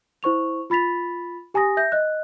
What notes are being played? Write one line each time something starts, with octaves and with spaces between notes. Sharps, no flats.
E4 C5 C#6 F7
F4 B5 A6 B6 F7
G4 G#5 A#5 D#6 A#6
E5 G6 A#6
D#5 F#6